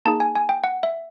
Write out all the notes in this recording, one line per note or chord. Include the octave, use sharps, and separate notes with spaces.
A#3 D#4 G#4 A5
G#5
G#5
G5
F#5
E5